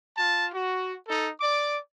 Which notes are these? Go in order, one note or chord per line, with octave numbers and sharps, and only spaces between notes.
F4 A5
F#4
D#4 A4
D5 D6